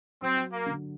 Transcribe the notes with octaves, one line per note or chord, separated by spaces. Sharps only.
F#3 C4
A#3
D3